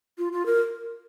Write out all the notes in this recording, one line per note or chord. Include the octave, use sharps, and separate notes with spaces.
F4
F4
A#4